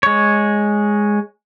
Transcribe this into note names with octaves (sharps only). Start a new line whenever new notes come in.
G#3 C#5